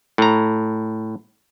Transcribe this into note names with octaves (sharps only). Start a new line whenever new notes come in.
A2 A#5